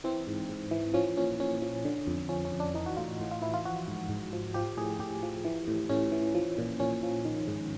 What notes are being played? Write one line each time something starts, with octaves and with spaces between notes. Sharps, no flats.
E3 C4
G#2
G#2
E3
F3 C#4
A#2 C#4
A#2 C#4
F3
D3
F2
F3 C#4
C#4
F2
D4
E3 D#4
F#4
A2 F4
A2
F4
E3 E4
F4
F3 F#4
G#2
G#2
F3
F3 G4
A2 G#4
A2 G4
F3
E3
A2
A2 C#4
E3
F3
A#2
A#2 C#4
F3
D#3
G#2